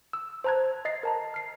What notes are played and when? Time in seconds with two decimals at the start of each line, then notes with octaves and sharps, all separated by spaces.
0.13 E6
0.44 C5 A5 A#5 F#6 G#6
0.85 D#5 A6 C7
1.03 A#4 A5 A#5
1.34 F6 C7